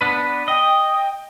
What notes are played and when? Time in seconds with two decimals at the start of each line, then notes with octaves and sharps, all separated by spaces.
0.01 B3 D4 B4
0.48 D#5 G5